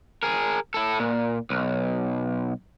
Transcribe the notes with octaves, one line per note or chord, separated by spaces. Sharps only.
G#4 A#4
E4 A4
A#2
B1